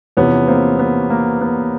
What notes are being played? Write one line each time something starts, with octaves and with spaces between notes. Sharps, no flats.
E2 C3 F3 B3 C#4
A#3 C4
B3
A#3
B3